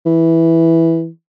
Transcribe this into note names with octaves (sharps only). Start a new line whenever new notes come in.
E3